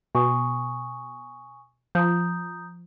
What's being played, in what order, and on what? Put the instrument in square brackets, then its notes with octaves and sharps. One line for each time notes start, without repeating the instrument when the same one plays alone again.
[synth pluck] B2 [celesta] G#5 C#6 D#6
[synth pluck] F3 [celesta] A#5 D#6 G6